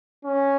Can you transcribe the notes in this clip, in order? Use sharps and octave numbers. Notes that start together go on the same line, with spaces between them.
C#4